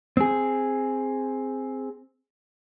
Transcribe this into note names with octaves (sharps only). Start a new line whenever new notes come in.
C4 G#4